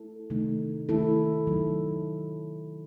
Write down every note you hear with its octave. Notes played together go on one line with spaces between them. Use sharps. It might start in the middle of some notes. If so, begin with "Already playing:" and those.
Already playing: A3 E4 A4
C3 D#3 A3 D#4
D#3 A3 E4 A4
D#3 F#3 A3 D#4